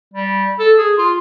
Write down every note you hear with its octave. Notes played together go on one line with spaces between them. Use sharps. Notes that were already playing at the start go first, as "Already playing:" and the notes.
G3
A4
G#4
F4